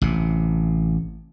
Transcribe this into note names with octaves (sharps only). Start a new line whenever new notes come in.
A1 C3